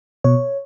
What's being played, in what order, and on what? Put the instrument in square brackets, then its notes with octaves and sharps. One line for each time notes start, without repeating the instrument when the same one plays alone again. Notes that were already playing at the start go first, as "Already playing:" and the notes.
[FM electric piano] B2 C#5